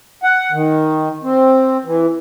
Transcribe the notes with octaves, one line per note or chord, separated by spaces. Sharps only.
F#5
D#3
C4
E3